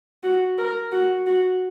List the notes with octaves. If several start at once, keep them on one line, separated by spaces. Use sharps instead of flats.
F#4
A#4
F#4
F#4